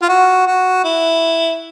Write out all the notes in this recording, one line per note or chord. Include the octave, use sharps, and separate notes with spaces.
F4
F#4
F#4
E4